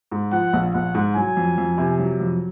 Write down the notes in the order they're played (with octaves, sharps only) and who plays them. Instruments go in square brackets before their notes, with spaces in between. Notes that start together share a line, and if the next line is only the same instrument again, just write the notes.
[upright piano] G#2
[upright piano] F3 [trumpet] F#5
[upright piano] A#1
[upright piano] A#1 [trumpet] F#5
[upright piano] G#2
[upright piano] F#3 [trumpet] G#5
[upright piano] F2
F2
C3
F#3
F2